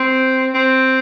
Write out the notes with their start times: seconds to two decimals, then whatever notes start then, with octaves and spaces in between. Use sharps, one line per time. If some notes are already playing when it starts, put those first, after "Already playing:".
Already playing: C4
0.54 C4